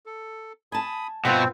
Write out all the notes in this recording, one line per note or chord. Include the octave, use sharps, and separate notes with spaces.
A4
G#5 A5 B5 D#6
G2 B2 F3 B3 C4 F4 C#6 E6